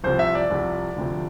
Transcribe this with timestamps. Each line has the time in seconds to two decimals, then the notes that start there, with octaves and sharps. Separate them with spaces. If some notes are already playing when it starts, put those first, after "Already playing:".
0.04 C2 C3 F3 C5
0.19 E5
0.35 D5
0.50 C2 C3 F3
0.96 D2 C3 F3